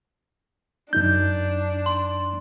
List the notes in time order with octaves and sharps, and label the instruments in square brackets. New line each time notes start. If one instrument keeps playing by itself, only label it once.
[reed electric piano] F#2 D#4 G6 [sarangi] D4
[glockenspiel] C6